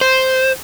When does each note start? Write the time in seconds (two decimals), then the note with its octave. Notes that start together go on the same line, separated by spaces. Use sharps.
0.01 C5